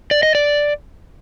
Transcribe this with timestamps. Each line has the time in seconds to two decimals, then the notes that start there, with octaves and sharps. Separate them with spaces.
0.11 D5
0.23 D#5
0.35 D5